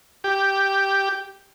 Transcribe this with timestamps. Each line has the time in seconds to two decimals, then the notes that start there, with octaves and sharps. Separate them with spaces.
0.24 G4